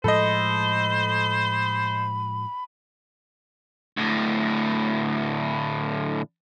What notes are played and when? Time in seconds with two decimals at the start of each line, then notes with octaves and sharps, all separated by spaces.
0.04 A2 F3 G#3 A4 C5 D#5 B5
3.97 D2 A2